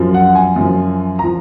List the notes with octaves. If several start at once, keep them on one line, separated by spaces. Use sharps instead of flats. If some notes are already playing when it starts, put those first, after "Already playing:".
Already playing: F#2 F3
F#5
G#5
F#2 F3
F3 A#5